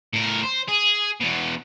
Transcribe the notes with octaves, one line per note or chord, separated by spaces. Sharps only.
A2 A#4
C5
G#4
E2 B2